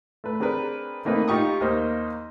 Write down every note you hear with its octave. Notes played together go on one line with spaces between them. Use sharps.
A3 B4
C4 D4 G#4 A#4 B4
A3 A#3 C4 D#4 B4
D#4 F4 G4 C#6 D#6
D#2 A#3 D#4 C5 D#5 F6